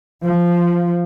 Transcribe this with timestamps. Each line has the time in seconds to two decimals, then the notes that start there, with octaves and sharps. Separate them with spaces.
0.24 F3